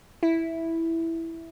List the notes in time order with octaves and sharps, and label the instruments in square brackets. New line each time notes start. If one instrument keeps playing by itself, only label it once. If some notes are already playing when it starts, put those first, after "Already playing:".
[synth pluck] E4